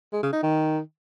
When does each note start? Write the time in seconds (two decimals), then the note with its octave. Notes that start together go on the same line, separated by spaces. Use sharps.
0.13 G#3
0.23 C#3
0.33 D#4
0.43 D#3